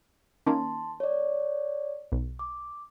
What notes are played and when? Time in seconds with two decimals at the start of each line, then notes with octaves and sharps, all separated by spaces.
0.47 D#3 A#3 C#4 A5 C6
1.00 C#5 D5
2.12 B1
2.39 D6